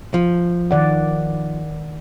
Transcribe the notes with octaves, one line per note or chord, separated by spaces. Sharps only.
F3
D#3 D5 F#5